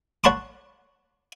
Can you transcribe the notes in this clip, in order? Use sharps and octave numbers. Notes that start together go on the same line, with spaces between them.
C#5 F#5 A5 B5 C6 D6